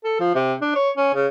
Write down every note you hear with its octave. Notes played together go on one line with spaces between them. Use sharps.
A4
F3
C3
D4
C#5
C#4
C#3